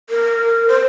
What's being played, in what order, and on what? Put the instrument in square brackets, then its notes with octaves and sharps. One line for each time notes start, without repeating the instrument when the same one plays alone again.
[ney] A#4
C5